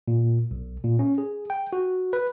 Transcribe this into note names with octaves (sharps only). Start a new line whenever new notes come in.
A#2
B1
A#2
C#4
G#4
G5
F#4
B4